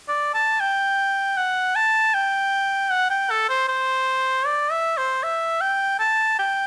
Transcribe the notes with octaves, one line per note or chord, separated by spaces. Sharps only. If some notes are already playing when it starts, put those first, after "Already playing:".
D5
A5
G5
F#5
A5
G5
F#5
G5
A4
C5
C5
D5
E5
C5
E5
G5
A5
G5